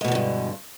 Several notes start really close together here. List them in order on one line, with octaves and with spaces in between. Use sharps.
G#3 B2 E2 D3 G2